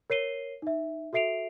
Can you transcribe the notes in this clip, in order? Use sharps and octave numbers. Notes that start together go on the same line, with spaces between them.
A#4 C#5 C7 D#7 G7
D#4 E5
F#4 A4 E5 C7 D7 F7